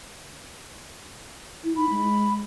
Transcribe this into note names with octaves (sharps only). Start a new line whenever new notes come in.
E4
D#4 B5
G#3